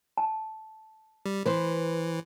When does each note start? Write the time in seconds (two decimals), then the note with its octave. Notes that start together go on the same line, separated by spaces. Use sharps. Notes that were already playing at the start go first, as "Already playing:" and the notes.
0.17 A5
1.26 G3
1.45 E3 B4 C5